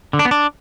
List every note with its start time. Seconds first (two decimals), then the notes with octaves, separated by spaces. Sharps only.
0.13 D3
0.19 D4
0.25 B3
0.31 D4